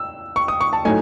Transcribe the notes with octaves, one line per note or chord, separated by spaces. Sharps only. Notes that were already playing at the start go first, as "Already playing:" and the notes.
Already playing: E6
C#6
D#6
C#6
A5
A2 F#3 A3 D#4 G#5